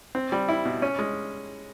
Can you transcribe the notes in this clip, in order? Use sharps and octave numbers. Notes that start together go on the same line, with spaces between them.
C4
G3
E4
B2
C#4
G#3